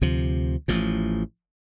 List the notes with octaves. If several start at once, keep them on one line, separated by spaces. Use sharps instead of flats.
D2 C3 F3
A1 A2 F3